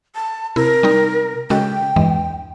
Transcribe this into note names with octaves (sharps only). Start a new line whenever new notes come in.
A5
C3 E4 A#4
G3 C4 D#4
C#3 G#3 F#4 A4 G5
E2 G2 E3 G#3